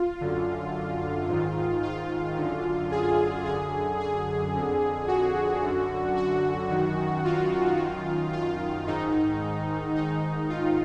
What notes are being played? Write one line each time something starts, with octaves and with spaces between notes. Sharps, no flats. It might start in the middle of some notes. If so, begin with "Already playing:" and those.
Already playing: F4
F#2 D3
G#2 D#3
F4
F#2 D3
G#4
F#2 D3 G#4
G#4
F2 D3
F#4
F#2 D3
F#4
F#2 D#3
F4
F#2 D#3
F4
G#2 D#3 D#4
G#2 D#3 D#4
F4